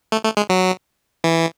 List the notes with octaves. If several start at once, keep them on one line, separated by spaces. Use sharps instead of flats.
A3
A3
G#3
F#3
E3